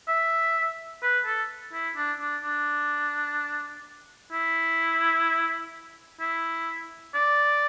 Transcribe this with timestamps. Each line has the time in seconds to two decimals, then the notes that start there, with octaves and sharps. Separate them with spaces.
0.08 E5
1.03 B4
1.26 A4
1.73 E4
1.96 D4
2.20 D4
2.44 D4
4.32 E4
6.20 E4
7.14 D5